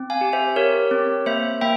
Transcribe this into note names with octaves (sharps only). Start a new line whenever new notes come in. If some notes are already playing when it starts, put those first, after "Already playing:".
Already playing: C4
F5 G#5
G4
C5 E5
G4 A#4 C#5
C4
A#3 C5 E5
A#3 E5 G5